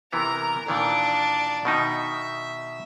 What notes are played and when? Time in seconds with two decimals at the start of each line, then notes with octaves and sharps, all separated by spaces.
0.13 C3 E3 B3 A#4 A#5
0.68 A#2 D#3 E3 D4 D5
1.65 B2 D#3 D#4 E5